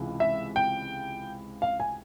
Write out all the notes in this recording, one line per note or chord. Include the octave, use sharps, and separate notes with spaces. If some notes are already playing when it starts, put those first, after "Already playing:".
Already playing: C#2 C3 E3
E5
G5
F5
G#5